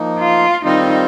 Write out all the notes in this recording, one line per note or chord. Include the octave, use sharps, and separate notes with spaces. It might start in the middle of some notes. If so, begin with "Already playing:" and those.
Already playing: F3 A#3 D#4
F4
D#3 G3 C4 D#4 F4 C5